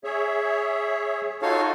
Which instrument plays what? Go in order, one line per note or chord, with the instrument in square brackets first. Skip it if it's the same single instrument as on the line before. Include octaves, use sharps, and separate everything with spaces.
[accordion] G#4 C#5 E5
[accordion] D#4 F4 F#4 [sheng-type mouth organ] A4 C#5 F5